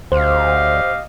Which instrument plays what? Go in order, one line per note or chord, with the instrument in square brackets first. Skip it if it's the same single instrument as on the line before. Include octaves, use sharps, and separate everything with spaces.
[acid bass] D2 [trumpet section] G4 D#5 F5 [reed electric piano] C5